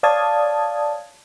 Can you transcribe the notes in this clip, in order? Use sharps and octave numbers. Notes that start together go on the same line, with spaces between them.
C#5 D5 F5 A5 D#6 G#6